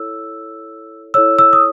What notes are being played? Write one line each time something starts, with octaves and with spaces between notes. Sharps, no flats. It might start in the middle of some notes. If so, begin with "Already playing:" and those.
Already playing: E4 A4 C#5 E6
E4 A4 C#5 E6
E6
D#6